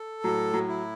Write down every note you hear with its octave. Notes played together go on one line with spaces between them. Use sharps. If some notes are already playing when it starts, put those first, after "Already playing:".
Already playing: A4
A2 F#3
F#3
E4